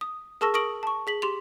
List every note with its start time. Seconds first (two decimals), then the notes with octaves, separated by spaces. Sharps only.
0.01 D#6
0.41 G#4 A#4 A5 C#6 E6 A#6
0.54 A#4 C#6 D#6 A#6 D7 F#7
0.83 A5 C#6
1.07 G#4 B6 F#7
1.22 G4 C6 F7